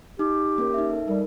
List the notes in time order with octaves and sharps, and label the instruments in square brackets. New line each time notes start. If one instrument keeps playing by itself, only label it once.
[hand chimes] D#4 [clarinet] G4
[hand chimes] A#3 C#4 A#4
D#4 E5
A4
[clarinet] G3 [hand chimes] D#4 A#4